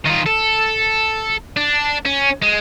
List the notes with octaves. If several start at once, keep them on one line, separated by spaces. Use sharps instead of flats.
D#3 F4
A4
D4
C#4
G#3